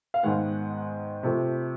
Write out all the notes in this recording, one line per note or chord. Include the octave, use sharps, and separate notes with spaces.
F5
G#2 D#3 G#3 B3 F#5
C3 F3 A3